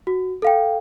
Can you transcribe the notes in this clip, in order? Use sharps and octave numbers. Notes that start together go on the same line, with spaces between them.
F#4
A4 F5 G5